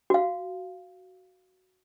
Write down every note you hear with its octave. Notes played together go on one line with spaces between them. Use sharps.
F#4 F5